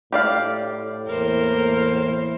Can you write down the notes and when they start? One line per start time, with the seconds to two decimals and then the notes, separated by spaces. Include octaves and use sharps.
0.13 A2 G4 D5 F5
1.08 E2 A#3 A#4 C5